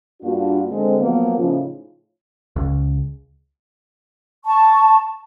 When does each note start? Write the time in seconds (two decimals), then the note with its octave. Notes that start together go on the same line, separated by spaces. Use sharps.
0.22 G2 A#3 D4 F4 F#4
0.70 D3 G#3 C4
0.99 F3 F#3 A#3 B3
1.38 A2 C#3 F3 C#4 D#4 F4
2.56 C#2
4.45 A5 C#6